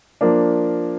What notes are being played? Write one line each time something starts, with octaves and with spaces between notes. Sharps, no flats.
F3 A#3 D4